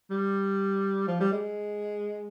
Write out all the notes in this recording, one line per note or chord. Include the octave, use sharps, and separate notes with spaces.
G3
F3
G3
G#3